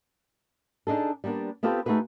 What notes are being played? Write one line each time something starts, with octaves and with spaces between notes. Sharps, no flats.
D4 D#4 G#4 A4
G3 A#3 B3 D4
B3 C4 F4 G4 A4 B4
A3 D#4 F#4 G#4 B4